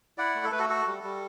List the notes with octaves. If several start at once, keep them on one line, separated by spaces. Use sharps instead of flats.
E4 D5 F#5
A3
A4
A3 B4
F#4 A4
F#4 A4
G3
G3